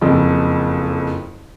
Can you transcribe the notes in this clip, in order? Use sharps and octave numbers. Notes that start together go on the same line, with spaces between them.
F#1 F2